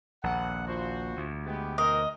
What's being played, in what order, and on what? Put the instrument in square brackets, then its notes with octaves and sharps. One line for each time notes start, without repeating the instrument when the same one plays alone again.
[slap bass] A#1 D#2 [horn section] F#5
[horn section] F4 F#4 C5
[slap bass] D2
[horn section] G#3 B3 G4
[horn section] B2 C4 A#4 [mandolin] D#5